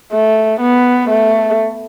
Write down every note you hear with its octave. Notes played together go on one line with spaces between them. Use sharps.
A3
B3
A3